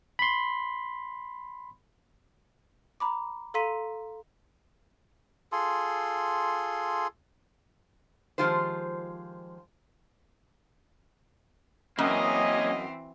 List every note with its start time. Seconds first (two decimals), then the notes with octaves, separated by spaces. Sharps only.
0.19 B5 C6
3.00 A#5 B5 D6
3.54 A4 F5 A#5 C6 B6 D#7
5.52 F4 G#4 A4 C6
8.38 D#3 F3 G#3 F4 G4 C5
11.99 F#2 E3 A#3 C4 C#4 D#5